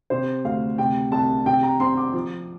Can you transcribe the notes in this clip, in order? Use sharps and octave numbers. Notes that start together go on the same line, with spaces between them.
C3 C5
D2 F5
C3 G5
C2 A5
C3 G5
A#5
C4 C6
D6
F3